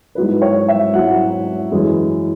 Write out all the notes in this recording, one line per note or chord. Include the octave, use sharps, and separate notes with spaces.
G#2 F#3 E4 B4
C#5
E5
G#2 F#3 E4 F#5
F#2 E3 G#3